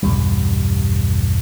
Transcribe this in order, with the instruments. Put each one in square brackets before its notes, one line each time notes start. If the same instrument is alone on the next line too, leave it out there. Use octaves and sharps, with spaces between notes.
[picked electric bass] B1 E2 G2 G3